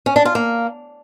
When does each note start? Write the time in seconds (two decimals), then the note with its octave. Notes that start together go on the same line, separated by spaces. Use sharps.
0.06 C#4
0.16 D4
0.25 F4
0.35 A#3